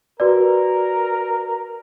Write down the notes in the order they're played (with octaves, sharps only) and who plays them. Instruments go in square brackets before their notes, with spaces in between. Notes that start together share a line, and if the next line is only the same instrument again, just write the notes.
[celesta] F#4 B4 D5 [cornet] A#4